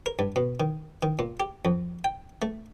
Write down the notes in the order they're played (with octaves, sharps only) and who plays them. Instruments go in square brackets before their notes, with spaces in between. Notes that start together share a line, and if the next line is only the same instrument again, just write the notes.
[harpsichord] A#4
G2
B2
D#3
D#3
A#2
G4
F2
G5
A3